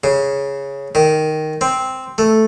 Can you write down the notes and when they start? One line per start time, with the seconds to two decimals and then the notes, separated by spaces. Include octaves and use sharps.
0.04 C#3
0.95 D#3
1.61 C4
2.18 A3